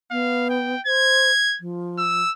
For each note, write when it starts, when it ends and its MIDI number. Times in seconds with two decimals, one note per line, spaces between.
0.11 0.75 59
0.11 0.48 77
0.50 0.81 79
0.86 1.31 72
0.86 1.58 92
1.60 2.23 53
1.98 2.31 88